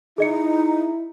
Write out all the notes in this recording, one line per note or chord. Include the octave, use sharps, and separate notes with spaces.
D#4 E4 G#4 D#5 C#7